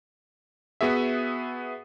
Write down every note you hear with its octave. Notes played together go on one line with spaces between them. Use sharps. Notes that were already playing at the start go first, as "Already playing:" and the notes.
B3 F#4 G#4 E5